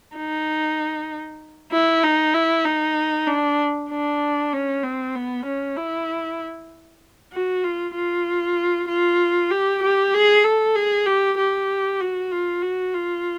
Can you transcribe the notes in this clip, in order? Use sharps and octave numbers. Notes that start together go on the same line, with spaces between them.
D#4
E4
D#4
E4
D#4
D4
D4
C#4
C4
B3
C#4
E4
F#4
F4
F4
F4
G4
G4
G#4
A4
G#4
G4
G4
F#4
F4
F#4
F4